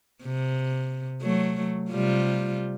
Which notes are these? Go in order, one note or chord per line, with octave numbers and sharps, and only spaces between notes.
C3
F#3 A3
C3 G3 F4